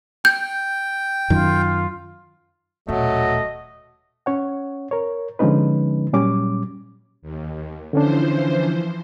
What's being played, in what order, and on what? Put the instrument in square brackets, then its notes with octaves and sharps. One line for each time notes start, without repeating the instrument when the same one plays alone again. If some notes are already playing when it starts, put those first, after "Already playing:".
[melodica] G5 [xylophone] G6
[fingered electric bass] F#2 D#3 [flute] F4
[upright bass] D#1 B2 [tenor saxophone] F#3 [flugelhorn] A3 [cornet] D#5
[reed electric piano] C#4 C#5 F#5
A#4 C#5
D3 F3 G#3 C#4 D#4 B4
A#2 F#3 G3 C#4 D6
[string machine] D#2
[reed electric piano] D3 C#4 D4 [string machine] E3 F3 C5